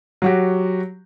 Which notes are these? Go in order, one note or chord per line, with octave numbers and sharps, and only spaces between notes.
F#3 F#4 G4